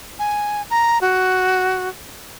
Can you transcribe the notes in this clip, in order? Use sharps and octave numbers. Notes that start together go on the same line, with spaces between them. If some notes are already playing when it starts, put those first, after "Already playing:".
G#5
A#5
F#4